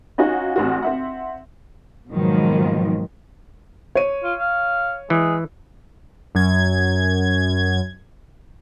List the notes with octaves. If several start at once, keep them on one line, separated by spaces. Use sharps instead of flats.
C#4 D#4 F4 F#4
A1 C4 F#4
C4 E5 F#5
G#2 B2 D#3 F3 F#3 A#3
C#5 D#7
F4
F5
E3 G#3
F#2 G#6